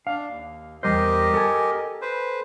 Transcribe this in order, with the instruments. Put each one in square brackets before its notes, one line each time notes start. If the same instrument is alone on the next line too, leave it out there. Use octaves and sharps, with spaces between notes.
[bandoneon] D4 [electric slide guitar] F5
[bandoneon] D#2
[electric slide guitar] E2 G3 C5 [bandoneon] G4 A#4 D#5
[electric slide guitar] A4 G#5
[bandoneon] B4 C5